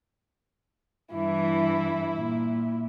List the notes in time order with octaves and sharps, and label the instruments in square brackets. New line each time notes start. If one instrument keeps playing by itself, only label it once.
[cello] G2 E3 [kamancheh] E4
[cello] A#2